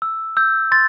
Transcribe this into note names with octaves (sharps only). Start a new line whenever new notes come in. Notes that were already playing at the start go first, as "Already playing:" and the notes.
E6
E6 G6
C6 A6